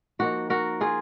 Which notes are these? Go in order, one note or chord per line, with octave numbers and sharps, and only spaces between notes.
F3 A#3 D#4 F#4
F#4 A#4
F4 G#4